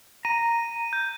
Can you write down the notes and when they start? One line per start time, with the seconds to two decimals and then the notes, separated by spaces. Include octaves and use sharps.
0.25 A#5 D#7
0.93 G6